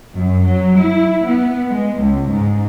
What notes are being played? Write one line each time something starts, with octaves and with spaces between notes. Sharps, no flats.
F#2
F#3
E4
B3
G#3
C#2
G#2